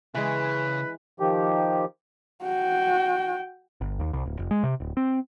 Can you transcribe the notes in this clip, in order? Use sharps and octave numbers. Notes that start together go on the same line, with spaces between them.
C#3 E3 G#3 B4
D#3 F3 G4
F#4 G5
G1
D#2
C2
D1
F1
G#3
C3
D1
C4